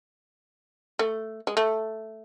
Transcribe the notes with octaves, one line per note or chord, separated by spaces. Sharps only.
A3
G#3
A3